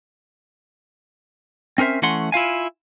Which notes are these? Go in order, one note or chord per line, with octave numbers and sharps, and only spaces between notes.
C4 C#4 A#4 C5 E5
E3 A3 C#4 F#5 C6
E4 F4 F5 G#5